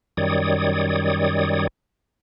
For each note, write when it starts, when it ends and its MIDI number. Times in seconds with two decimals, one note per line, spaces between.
0.17 1.67 42
0.17 1.67 51
0.17 1.67 55
0.17 1.67 73
0.17 1.67 74
0.17 1.67 87